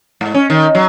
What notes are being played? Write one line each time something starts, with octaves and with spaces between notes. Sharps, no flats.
G#2
C#4
D#3
F#3